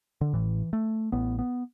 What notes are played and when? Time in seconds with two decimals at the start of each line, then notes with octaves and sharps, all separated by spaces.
0.21 D3
0.33 A1 A2 E3
0.73 A3
1.12 A1 A2 B3
1.39 B3